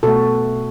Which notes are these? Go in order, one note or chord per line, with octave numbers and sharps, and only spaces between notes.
B2 A3 F#4 A4